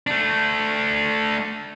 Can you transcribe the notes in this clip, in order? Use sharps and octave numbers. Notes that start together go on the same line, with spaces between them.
A3 D4